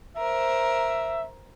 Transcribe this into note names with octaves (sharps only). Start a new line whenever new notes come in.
A#4 C5 E5